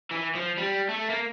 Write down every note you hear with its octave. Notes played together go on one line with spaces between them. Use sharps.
E3
F3
G3
A3
A#3